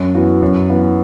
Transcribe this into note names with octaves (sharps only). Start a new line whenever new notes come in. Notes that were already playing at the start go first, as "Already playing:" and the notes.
Already playing: F#2
E3 B3 F#4
F#2
E3 B3